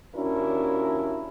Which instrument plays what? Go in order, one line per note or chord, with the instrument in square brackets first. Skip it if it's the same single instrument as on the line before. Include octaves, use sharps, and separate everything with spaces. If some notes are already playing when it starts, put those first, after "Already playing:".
[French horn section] D#2 C#4 D4 E4 F#4 A#4